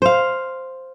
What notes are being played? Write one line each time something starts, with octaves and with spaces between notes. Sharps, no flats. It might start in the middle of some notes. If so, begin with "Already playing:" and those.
C5 F5